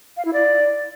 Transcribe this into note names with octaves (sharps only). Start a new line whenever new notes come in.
F5
E4
D5